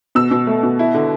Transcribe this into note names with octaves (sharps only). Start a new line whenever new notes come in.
B2 E6
B2
A3
B2
E4
D3